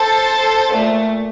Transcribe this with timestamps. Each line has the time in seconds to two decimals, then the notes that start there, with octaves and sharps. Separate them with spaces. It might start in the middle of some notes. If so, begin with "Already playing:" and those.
Already playing: A4 C5
0.73 A#2 A3